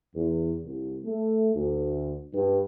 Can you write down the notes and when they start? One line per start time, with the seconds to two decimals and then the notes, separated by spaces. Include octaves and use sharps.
0.15 E2
0.65 C2
1.05 A3
1.55 D2
2.33 G2